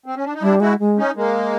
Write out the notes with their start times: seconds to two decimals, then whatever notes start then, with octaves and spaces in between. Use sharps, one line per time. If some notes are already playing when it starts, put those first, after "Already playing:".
0.06 C4
0.16 C#4
0.25 D4
0.34 D#4
0.42 G3 D4 E4
0.60 G#3 E4 F#4
0.79 G#3
0.97 C#4 D#4
1.16 G#3 A#3